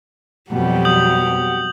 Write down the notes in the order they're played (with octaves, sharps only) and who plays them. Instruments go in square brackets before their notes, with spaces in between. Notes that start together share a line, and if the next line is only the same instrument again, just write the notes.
[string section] F2 B2 [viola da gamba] F#3 G3 [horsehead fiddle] G4 F#5
[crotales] D#6 G6 F#7